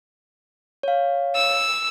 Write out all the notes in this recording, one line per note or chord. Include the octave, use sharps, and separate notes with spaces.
C#5 F5
E6